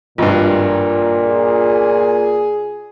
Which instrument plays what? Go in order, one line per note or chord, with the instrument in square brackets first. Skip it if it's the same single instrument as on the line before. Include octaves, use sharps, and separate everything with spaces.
[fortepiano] G#1 G2 [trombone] A#2 [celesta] F4
[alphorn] G#4